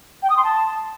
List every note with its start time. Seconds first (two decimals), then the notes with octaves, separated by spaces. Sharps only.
0.23 G5
0.30 D#6
0.37 C6
0.44 A5